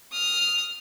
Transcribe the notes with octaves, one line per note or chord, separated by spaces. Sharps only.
D#6 F6